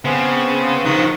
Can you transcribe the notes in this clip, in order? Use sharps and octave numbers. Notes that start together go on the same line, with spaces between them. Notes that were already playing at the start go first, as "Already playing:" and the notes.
C#3 B3 C4
D#3 F3 C#6 D#6 F#6